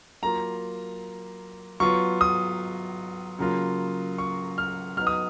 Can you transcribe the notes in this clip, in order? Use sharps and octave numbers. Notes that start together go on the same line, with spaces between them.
F#3 A#3 F4 A#5
F#3 B3 F4 C#6
D#6
C#3 F#3 A#3 F4
C#6
F6
F#3 B3 D#4 F6
D#6